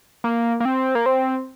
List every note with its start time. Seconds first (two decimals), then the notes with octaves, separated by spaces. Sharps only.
0.24 A#3
0.60 A#3
0.65 C4
0.95 A#3
1.06 C4